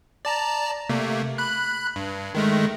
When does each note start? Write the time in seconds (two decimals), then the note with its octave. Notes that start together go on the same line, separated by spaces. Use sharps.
0.25 D5 A5 A#5
0.89 C3 A3 A#3
1.38 B5 F#6
1.96 G2
2.35 D#3 G#3 A3